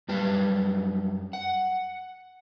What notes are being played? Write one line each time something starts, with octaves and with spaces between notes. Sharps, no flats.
F#2 G3 B4 G5
F#5